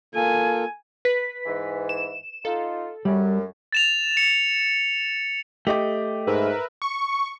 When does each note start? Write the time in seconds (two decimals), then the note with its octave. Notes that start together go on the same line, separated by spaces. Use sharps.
0.15 A#3 F4 A4 G#5
1.05 B4 B6
1.45 G#2 E3
1.89 E7
2.45 D#4 F4 A4
3.05 F#2 G3
3.72 A6 E7 F7
4.17 C#7
5.67 A3 G4 D#5 D6
6.27 G#2 A#4 B4 E5
6.82 C#6